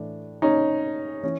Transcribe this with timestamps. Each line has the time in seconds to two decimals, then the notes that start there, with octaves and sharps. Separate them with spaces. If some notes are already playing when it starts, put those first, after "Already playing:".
Already playing: A2 E3 D4
0.42 C#4 D#4
1.23 E3 C#4